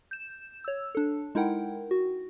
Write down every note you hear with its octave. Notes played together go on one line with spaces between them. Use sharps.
G6 E7
C#5 E6
D4 A4
G#3 D#4 E4 A#4 F#5 G5
F#4